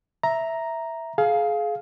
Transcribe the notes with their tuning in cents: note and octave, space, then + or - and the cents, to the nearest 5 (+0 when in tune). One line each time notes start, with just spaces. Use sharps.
E5 +0 A#5 +0
G#4 +30 F5 +0